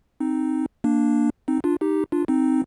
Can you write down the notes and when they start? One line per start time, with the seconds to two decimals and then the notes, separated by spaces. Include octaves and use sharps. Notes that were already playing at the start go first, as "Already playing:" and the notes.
0.20 C4 D#4
0.84 A#3 D4
1.48 C4 D#4
1.64 D4 F4
1.81 D#4 G4
2.12 D4 F4
2.28 C4 D#4